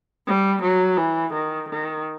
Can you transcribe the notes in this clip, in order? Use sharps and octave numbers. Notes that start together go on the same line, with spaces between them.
G3
F#3
E3
D#3
D#3